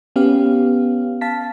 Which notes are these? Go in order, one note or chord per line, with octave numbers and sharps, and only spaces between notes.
B3 C#4 G4 F5
F5 A5 B6